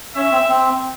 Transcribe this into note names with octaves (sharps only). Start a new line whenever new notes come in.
C#4 E5
C4
C4